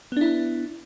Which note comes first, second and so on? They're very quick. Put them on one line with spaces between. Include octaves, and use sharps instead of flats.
B3 D4 E4